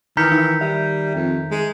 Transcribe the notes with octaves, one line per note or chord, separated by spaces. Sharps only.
D#3 E3 A#5 F6 G6 B6 C#7
D#4
G3 E5
F2
G#3